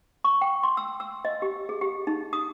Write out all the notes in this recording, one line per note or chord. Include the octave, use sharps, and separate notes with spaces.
C#6
G5
C6
E6
E6
D#5
G4
G#4
G4
D#4
D#6